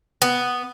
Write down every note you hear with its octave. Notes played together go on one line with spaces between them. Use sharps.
B3